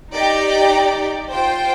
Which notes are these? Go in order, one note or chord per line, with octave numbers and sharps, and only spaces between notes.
D#4 G4 D5 G5
F4 C5 G5